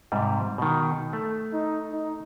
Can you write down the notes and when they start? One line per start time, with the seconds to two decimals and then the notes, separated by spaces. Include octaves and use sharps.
0.12 G#2 C3 G3
0.58 B2 D#3
1.13 A3
1.53 D#4
1.92 D#4